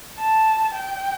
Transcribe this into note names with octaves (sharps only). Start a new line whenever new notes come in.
A5
G5